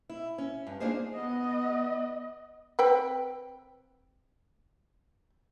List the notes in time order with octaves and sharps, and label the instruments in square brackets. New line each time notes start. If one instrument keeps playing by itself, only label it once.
[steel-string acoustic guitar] E4
C#4
G2
A#3 D4 D#4 F4 G#4 C5
[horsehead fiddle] B3 D#5
[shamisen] C4 B4 G5